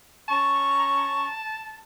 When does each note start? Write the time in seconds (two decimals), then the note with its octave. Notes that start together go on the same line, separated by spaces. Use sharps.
0.28 C#4 A5 A#5 C#6